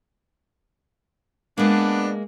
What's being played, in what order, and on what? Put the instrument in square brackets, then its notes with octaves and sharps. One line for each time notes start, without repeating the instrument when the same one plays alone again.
[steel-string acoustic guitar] G#3 A#3 [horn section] B3 D4